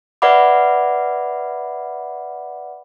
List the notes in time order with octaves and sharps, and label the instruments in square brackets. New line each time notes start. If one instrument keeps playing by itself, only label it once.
[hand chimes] B4 D5 E5 F#5 B5 D6